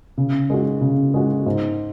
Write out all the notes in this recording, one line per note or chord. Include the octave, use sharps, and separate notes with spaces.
C#3
G#3 F#4
C#3
G#3 F#4
G#2